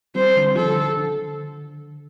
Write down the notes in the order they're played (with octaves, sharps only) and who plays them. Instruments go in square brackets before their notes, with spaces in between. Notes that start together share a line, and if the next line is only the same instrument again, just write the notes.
[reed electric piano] G3 C4 [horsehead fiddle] C5
[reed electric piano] D3 G3
[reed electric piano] F3 [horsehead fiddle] A4
[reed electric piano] D3
D3